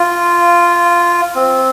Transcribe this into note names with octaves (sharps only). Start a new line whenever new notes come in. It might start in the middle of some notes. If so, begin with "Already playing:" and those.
Already playing: F4
C4